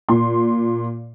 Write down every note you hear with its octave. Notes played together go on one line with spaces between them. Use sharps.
A#2 C6